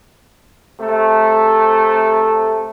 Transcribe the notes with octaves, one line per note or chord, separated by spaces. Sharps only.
C3 A3